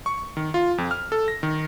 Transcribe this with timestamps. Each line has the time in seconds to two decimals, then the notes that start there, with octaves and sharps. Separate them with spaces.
0.06 C#6
0.37 D#3
0.54 F4
0.78 F2
0.91 F6
1.12 A4
1.28 A#6
1.43 D#3